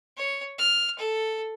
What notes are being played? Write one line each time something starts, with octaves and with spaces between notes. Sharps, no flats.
C#5
F6
A4